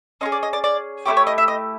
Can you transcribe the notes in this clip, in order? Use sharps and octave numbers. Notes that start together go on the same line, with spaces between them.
C#4 F4 G#4 D#5
D5
D#5
D5
D5
A3 C#4 E4 G4 C#5
C#5
D#5
E5
D#5